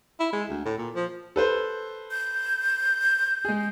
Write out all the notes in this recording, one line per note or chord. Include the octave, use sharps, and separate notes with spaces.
E4
G#3
D2
A2
A#2
F3
A4 B4 C5
G6
G#3 G#4